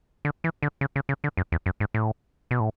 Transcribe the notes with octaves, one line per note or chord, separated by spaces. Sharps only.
D3
E3
D3
C#3
C#3
C#3
D3
F#2
E2
F#2
G#2
A2
B2
A2